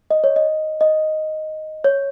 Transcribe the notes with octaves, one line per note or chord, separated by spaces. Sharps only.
D#5
C#5
D#5
D#5
C#5